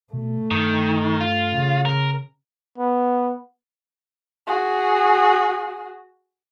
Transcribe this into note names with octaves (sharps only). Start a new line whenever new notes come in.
B2 A3
G2 D#3
F4
C#3
A#4
B3
F#4 G#4